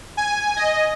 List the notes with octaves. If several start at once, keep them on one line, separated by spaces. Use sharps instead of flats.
G#5
D#5